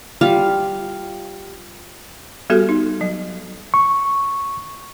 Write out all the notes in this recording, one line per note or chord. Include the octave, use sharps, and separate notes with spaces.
G3 F4 F5
G3 B3 F#4 G4 A4
D#4
F#3
C#6